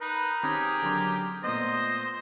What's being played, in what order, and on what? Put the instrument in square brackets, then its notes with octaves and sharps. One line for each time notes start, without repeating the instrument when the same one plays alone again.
[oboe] D#4 [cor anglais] A#4 [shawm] B4
[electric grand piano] D#3 C4 C#4 [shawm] G4 [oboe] G#4
[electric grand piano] D3 F#3 C6
[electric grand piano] A#2 A3 B3 [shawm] C5 [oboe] D#5